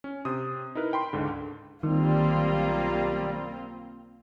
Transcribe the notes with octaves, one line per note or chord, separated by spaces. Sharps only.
C#4
C3 C5 D#6
D#4 E4 A#4 B4
G5 B5 C6
C#2 G#2 D3
B1 D#3 G3 A#3 C4 F4